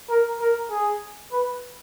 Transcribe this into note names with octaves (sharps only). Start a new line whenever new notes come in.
A#4
A#4
G#4
B4